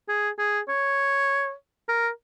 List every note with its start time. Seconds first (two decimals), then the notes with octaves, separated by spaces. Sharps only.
0.08 G#4
0.39 G#4
0.69 C#5
1.88 A#4